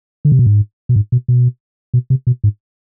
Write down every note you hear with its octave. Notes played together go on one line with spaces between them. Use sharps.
D3
C3
B2
G#2
B2
G#2
B2
B2
B2
C3
B2
G#2